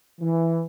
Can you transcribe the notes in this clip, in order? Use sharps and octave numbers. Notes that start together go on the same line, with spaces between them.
E3